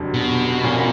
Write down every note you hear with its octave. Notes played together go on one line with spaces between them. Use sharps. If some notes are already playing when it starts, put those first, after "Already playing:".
Already playing: F1 F2 D3 F#3
B2
A#2 F3 A#3 C#4